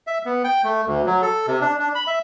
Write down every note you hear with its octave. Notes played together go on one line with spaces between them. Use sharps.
E5
B3
G5
A3
D2
F#3
A4
C3
D4
D4
B5
E5